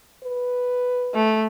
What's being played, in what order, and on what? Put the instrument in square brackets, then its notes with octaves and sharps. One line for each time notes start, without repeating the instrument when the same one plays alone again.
[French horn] B4
[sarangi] A3